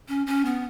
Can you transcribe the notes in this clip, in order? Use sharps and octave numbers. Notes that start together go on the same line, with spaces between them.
C#4
C#4
B3